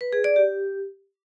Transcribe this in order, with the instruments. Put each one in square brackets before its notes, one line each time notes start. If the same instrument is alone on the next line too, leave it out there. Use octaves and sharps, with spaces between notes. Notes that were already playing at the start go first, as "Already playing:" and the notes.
[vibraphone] B4
G#4
D5
G4